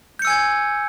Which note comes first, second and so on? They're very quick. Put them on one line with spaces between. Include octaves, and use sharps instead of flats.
G6 C#7 E6 G#5 G#6